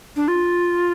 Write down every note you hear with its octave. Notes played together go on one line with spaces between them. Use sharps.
D4
F4